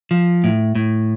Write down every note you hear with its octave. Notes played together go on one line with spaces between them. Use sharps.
F3
A2
A2